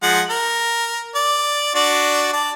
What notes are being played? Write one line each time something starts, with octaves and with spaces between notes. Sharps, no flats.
F3 G#3 F#5
A#4
D5
D4 F#4 D5
D5 A5